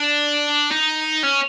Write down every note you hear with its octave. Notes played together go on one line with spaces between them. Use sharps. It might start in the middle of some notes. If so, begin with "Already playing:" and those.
Already playing: D4
D#4
C#4